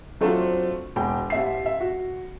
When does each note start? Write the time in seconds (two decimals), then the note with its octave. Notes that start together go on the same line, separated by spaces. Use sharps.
0.21 F#3 A3 C4 D4 F4 C5
0.96 E1 G5
1.30 A1 E5 C7
1.66 E5
1.81 F#4